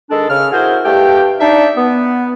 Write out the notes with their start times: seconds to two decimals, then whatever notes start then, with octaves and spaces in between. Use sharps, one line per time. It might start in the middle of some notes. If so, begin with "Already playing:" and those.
0.10 D#3 G#3 D4 A4
0.29 C#3 F6
0.52 E4 F#4 G#4 A#4 C5
0.85 G2 A3 G4 F5 G5
1.40 D4 D#4 E5
1.77 B3